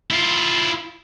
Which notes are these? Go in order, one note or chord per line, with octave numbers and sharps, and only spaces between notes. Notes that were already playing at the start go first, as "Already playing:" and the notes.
E4 F4